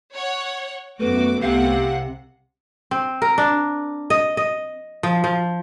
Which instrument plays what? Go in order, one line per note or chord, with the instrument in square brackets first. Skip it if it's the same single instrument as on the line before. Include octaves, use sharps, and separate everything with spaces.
[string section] C#5 F#5
[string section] F#2 F#4 D6 [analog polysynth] A3 B3 [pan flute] B4
[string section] C2 C3 F#5 [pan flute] F5
[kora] C4
A#4
D4
D#5
D#5
F3
F3